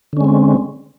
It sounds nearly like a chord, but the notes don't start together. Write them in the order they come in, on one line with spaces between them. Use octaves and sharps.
D3 C#4 G#3 C4